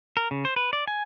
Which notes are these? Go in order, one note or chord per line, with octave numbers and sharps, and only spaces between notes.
A#4
C#3
C5
B4
D5
G#5